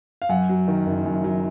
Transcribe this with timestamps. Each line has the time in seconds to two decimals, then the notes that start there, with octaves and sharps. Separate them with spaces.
0.22 F5
0.29 F#2 F#5
0.49 F#3
0.68 D#3
0.86 F#1
1.06 F#2
1.24 F#3